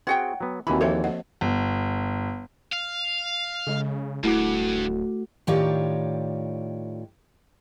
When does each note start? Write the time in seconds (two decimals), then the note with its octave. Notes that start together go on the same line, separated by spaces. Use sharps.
0.07 C4 F#4 G#4 C#5 F#5 G5
0.41 F#3 B3
0.67 D#2 E3 C4 F#4 G#5 B5
0.81 F3 A#3 A4 C5 C#5 E5
1.04 D#5 F#5
1.41 G1
2.73 F5
3.67 C#3 G#3 A4
4.23 D1 G2 A3 E4 F#4 D6
5.47 A2 D#3 F4 G4 C#5 D5